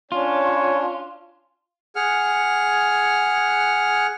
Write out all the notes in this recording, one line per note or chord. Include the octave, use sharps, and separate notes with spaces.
C#4 D4 F4 C#5
G#4 F#5 F6